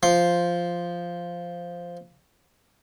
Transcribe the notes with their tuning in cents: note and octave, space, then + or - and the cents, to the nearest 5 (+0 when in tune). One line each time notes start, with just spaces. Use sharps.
F3 -5 C6 +0